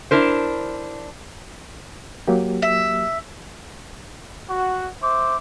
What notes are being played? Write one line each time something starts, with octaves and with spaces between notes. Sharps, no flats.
D4 E4 A#4 C5
F#3 A#3 G4
E5
F#4
C5 E5 D6